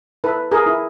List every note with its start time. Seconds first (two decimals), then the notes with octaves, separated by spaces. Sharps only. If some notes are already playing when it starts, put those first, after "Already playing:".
0.24 E4 A4 B4
0.51 G#4 A#4
0.66 E4